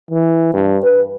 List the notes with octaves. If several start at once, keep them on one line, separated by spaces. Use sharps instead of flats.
E3
G2
B4